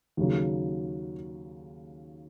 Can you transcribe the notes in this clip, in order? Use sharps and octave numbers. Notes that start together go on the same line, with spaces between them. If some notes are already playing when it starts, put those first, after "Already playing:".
D#2 C#3 F#3